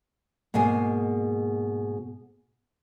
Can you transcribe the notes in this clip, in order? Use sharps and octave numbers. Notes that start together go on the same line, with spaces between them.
G#2 B2 A#3 G#4 G#5